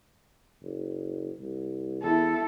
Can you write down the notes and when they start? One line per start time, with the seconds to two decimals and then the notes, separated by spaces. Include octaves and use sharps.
0.62 F#1
1.39 C2
2.03 E2 E4 A4